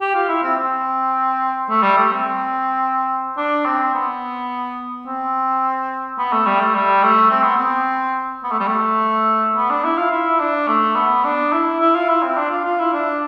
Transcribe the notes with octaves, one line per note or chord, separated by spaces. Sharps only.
G4
F4
E4
C4
C4
A3
G3
A3
C4
D4
C4
B3
C4
B3
A3
G3
A3
G3
A3
C4
B3
C4
B3
A3
G3
A3
B3
D4
E4
F4
E4
D4
A3
B3
D4
E4
E4
F4
E4
C4
D4
F4
F4
E4
D4